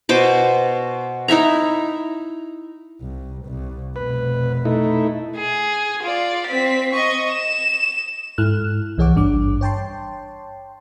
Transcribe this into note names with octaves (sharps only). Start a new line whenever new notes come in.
B2 C5 D6
D#4 E4 E5 A#5
C2
C2
F1 B2 B4
A3 D#4 E4
G#4
F4 D5
C4 B6
D#5 C#6
E7
G#2 E4 A4 F6 F#6
C2 E3 G#4 C#5 F#5 D6
G#1 G2 D4 D6
C#5 G5 A5 C6